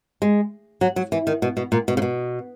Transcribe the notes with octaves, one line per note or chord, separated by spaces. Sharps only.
G#3
F#3
F#3
E3
D#3
B2
B2
A#2
B2
C#3
B2